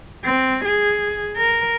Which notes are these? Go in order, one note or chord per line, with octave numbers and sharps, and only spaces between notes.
C4
G#4
A#4